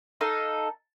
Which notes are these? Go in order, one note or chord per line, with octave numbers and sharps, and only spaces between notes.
D#4 A4 F5